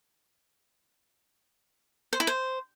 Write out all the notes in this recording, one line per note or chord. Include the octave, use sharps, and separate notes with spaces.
C5
E4
C5